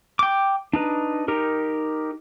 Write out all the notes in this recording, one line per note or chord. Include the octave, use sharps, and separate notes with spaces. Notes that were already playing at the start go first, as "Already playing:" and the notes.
G5 D6
D4 D#4 B4
D#4 G4 A#4